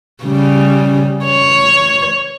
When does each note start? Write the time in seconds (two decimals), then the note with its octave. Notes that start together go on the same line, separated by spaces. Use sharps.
0.24 C#3 G3
1.26 C#5